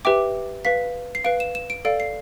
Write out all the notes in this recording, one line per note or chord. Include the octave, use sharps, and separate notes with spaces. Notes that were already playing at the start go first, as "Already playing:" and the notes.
G4 B4 E5 G5 D6
B4 F5 B6
C7
B4 F5 D7
E7
E7
D7
A4 D5 F5 D7
C7